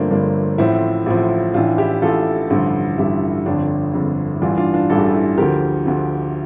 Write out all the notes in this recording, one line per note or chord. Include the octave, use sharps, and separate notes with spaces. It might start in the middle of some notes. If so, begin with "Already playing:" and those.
Already playing: G1 G2 F3 A3 A#3 C4 D4
G1 G2 F3 A#3 D4
A1 A2 F3 C4 E4
A1 A2 F3
A1 A2 E3 D4 F4
E4 G4
A1 A2 E3 F4 A4
A1 G2 D3 F3
A1 G2 D3 F3 E4 G4
G1 F2 D3 D4 F4
G1 F2 D3
E4
A1 G2 E3 D4 F4
D4 F4
D4 F4
A1 G2 E3 A4
G4
F4
E4 G4
D2 D3 F3 G4 A#4
D2 D3 F3